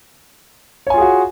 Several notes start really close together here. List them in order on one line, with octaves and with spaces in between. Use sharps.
C#5 G#5 F4 G#4 F#4